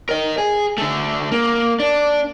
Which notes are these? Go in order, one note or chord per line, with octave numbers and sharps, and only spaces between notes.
A#4 D#5
G#4
D3 A3
A#3
D4